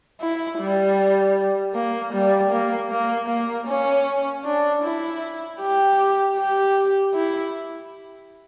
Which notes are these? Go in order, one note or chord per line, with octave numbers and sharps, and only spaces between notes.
E4
G3
A#3
G3
A#3
A#3
A#3
C#4
D4
E4
G4
G4
E4